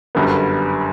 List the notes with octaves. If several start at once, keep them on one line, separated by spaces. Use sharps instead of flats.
G1 F#2 D3 G3 B3